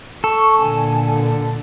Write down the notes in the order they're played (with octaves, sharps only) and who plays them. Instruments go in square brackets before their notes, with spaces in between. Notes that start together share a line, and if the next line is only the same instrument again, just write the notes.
[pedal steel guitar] A4 [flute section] C#6
[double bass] A#2 D3 [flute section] G#5